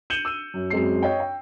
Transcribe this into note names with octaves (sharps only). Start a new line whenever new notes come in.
G6 C#7 D#7 E7 F#7 G7
E6 D#7
F#2
F#2 G#3 C4 C7
C#5 D#5 G5
G5